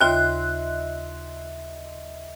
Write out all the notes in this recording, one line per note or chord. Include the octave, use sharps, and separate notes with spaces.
D#2 C#3 F4 D#5 E5 C6 F#6